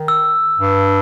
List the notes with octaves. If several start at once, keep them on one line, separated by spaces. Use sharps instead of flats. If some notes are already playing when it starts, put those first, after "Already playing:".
Already playing: D#3
E6
G2